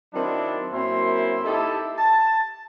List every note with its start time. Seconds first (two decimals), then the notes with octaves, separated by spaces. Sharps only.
0.13 D#3 F#3 C4 D4 E4
0.72 F#2 A#3 C4 E4 C6
1.44 D#4 E4 G4 A4
1.96 A5